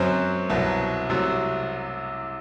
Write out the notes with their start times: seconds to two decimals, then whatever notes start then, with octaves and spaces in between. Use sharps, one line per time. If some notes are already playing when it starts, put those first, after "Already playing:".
Already playing: F#2 F#3 C4
0.49 C2 B2 F#3
1.09 C2 C3 F#3